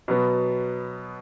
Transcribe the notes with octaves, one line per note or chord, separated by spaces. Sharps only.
B2 F#3 B3